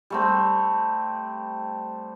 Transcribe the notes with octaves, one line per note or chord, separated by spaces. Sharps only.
G3 A3 C4